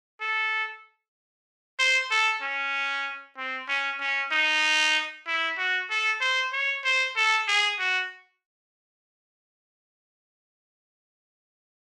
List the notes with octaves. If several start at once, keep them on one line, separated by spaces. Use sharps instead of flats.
A4
C5
A4
C#4
C4
C#4
C#4
D#4
E4
F#4
A4
C5
C#5
C5
A4
G#4
F#4